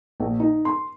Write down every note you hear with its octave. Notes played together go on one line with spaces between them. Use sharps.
A#1
D#4
C6